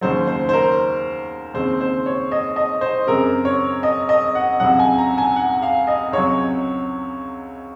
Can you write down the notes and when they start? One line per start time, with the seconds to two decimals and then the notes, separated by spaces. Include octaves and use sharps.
0.01 D#2 C#3 F#3 C5
0.27 C5
0.49 C5
0.53 A#4
1.54 D#2 C#3 G#3 C4 C5
1.81 C5
2.06 C#5
2.32 D#5
2.56 D#5
2.81 C5
3.07 F#2 C#3 G#3 C4 A#4
3.45 C#5
3.83 D#5
4.09 D#5
4.35 F#5
4.60 C#2 C3 F#3 F#5
4.79 G#5
4.98 A#5
5.18 G#5
5.36 F#5
5.62 F5
5.87 D#5
6.13 C#2 C3 F#3 C#5